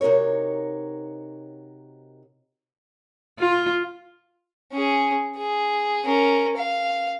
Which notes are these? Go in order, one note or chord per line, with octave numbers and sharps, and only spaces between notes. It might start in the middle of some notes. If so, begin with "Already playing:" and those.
C3 D#4 F#4 A#4 C#5
F4
C#4 G#4
G#4
C#4 A#4
F5